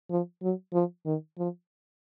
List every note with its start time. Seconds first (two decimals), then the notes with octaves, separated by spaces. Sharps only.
0.10 F3
0.43 F#3
0.73 F3
1.06 D#3
1.38 F3